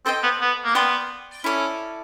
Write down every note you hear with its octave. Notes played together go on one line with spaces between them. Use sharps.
C4 A4 C5 D#5 G5
B3
B3
A#3
B3 D5 G5 C6 D#6
C#4 E4 A4 D5